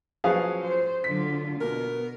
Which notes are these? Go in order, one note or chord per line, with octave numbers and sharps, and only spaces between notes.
F3 F#3 C#4 G#4 B4 F5
C5
D3 F#3 F4 B6
B2 B3 A#4